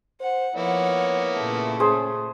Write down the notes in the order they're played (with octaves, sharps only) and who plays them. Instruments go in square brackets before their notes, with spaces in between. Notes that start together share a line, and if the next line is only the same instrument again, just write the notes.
[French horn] C5 [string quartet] F#5
[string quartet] F3 F#5 [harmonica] A#3 B3 E4 [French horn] C#5
[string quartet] A#2 C#3 A3
[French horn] C#4 [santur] G#4 C5